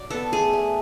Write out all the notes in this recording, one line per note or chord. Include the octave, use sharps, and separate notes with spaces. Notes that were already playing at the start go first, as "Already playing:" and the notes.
Already playing: F#3 D5
B3 A4
A3 G#4
A3